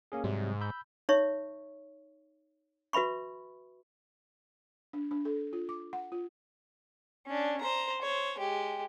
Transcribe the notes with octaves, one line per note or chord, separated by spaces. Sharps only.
A#3 C#4 G#4
G#2 C3 F#3 G3
B5 E6 G6
D#4 C#5 E5 C#6
F#4 B4 E5 B5 C#6
D4
D4
A4
F4
D6
F#5
F4
C#4 D4
C5 A#5
C5 C#5
G#3 G4